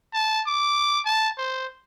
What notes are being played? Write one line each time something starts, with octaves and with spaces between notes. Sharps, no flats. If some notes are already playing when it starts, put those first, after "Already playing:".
A5
D6
A5
C5